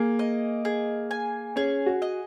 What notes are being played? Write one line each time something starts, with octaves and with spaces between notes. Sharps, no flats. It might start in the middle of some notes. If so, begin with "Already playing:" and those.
Already playing: A#3 G#4
D#5
G#4
G#5
C#4 G#4
F#4
D#5